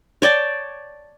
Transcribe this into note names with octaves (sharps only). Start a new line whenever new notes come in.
C#5 D5 G5 A5